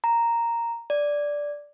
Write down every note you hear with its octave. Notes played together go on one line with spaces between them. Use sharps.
A#5
D5